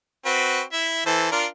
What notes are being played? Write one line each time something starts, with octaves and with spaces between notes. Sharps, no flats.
C4 F#4 B4
E4 E5
E3 A4 C5
D4 F4 A#4